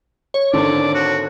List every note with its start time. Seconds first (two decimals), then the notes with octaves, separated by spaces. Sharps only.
0.34 C#5
0.53 G#1 D3 A4 D5
0.94 F#4